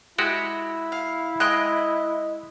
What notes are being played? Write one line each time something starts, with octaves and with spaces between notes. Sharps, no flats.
G#3 E4 F#4 G4 E6
F5
G#3 D#5 G5 D#6 F#6